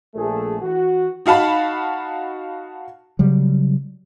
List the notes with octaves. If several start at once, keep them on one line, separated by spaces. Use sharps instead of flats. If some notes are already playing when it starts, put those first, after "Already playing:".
A#1 A3 G#4 A4
E3 F#4
D#4 F#4 F5 A5 B5
C#3 F#3 G3